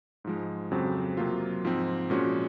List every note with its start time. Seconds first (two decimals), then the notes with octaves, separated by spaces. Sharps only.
0.24 G#2 F3 G#3
0.71 F2 C#3 F#3 C4 F#4
1.17 C3 F#3 A#3 F4
1.64 G#2 F3 C4
2.10 A#2 F3 G#3 C#4 F#4